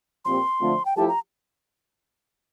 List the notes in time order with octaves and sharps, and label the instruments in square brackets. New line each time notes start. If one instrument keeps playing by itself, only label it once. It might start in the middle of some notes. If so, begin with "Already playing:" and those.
[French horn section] A#2 F3 C4 G4 [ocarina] C6
[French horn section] D3 F3 A3 C4 F4
[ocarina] G5
[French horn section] F3 A3 E4 G4 [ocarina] A5
[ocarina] A#5